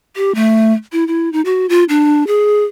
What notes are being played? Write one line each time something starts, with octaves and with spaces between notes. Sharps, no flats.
G4
A3
E4
E4
D#4
F#4
F4
D4
G#4